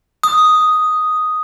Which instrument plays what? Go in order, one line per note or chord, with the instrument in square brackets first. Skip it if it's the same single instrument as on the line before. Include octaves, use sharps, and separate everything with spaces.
[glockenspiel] D#6